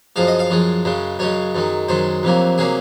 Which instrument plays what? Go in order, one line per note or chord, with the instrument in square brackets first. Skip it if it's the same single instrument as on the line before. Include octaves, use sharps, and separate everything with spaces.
[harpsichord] F#2 F3 G#3 F5
D#5
F5
F#2 F3 G#3
F#2 C#3 G#3
F#2 C#3 G#3 C#5
F#2 D#3 G#3
F#2 D#3 G#3 C5
F2 C3 F#3 A#3
C3 F#3 A#3 G#4